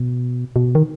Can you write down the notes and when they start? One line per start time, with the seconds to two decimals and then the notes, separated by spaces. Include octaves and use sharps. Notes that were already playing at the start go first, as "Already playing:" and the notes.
Already playing: B2
0.56 B2
0.75 D#3